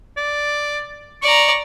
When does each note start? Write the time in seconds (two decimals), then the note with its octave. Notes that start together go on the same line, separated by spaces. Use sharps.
0.17 D5
1.22 D5 A#5 C#6